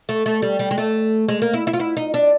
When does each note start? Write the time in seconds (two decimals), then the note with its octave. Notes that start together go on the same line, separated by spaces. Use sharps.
0.09 A3
0.26 A3
0.42 G3
0.59 G3
0.71 G#3
0.78 A3
1.28 G#3
1.42 A#3
1.54 E4
1.67 E4
1.74 F4
1.80 E4
1.97 D#4
2.14 D4